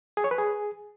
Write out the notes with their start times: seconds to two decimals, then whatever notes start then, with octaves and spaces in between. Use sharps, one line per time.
0.17 G#4
0.24 C#5
0.31 B4
0.38 G#4